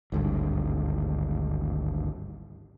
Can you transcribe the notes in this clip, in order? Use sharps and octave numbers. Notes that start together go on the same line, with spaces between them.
G#1 D2 G2